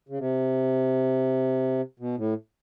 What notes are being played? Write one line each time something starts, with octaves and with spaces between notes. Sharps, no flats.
C#3
C3
B2
A2